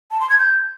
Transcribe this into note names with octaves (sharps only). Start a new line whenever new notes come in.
A5
C6
G#6
G6